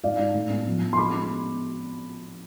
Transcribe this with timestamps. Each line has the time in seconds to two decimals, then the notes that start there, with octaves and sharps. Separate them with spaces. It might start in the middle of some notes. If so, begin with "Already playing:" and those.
0.04 G#2 D5 F5
0.19 G#2
0.34 A2
0.50 B3
0.67 F3
0.82 F3
0.93 C6
0.97 G#3 B5 D6
1.14 B3